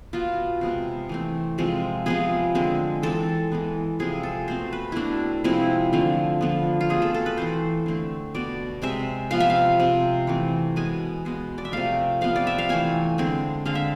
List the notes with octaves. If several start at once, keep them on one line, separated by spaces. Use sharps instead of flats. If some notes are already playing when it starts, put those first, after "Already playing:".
B2 B3 F4
C3 G#3 B3
E3 A3 C4
C3 F3 G#3 C4
C3 F3 B3 G#4
D3 G#3 C4
E3 G#3 C4 A4
E3 G#3 B3
C3 F3 G#3 C4 G#4
A4
B2 A3 C4 C5
B4
B2 A3 C4 D4 E4
C3 F3 G#3 C4 E4
D3 F3 A3 C4
D3 F3 B3
F4
B2 A3 C4 G#4
A4
A4
B4
E3 A3 C4 C5
D3 A3 C4
B2 B3 D5
C3 G#3 C4 E5
C3 F3 B3 F5
E5
F5
C3 G#3 C4
E3 A3 C4
B2 G#3 B3 G#5
B2 G#3 B3
D5
E5
C3 F3 A3 F5
C3 F3 B3 F5
D5
E5
F5
E3 A3 C4 G#5
D3 G#3 C4
D3 G#3 C4 F5
E5